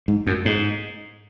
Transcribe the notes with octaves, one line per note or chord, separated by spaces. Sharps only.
G#2
F#2
G#2